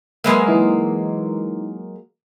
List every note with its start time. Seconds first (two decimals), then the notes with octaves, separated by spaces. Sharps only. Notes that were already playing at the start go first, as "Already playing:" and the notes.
0.24 F#3 G#3 A#3 B4 E5
0.47 E3 D#4